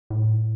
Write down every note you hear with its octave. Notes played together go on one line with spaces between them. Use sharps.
A2